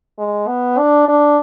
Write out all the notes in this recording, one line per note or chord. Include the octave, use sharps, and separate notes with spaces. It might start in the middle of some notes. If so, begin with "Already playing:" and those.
G#3
B3
D4
D4